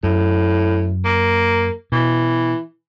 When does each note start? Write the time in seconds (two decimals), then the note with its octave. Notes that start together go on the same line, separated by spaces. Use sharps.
0.03 F#2 A2
1.05 A#3
1.92 B2 E3